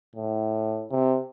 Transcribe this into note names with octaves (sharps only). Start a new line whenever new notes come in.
A2
C3